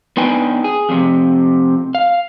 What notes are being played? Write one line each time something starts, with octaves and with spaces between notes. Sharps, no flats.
B3 D4 D#4 B4 G5 G#5
G#4
F2 C3
F5